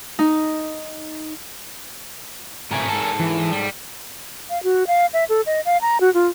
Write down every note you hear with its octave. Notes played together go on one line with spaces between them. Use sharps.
D#4
A2 C3 A3 A#4 G#5
G#2 A4 A5
E3
G3
F5
F#4
F5
E5
A4
D#5
F5
A#5
F#4
F4